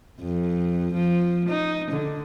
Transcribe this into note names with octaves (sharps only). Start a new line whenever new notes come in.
F2
F3
D#4
D3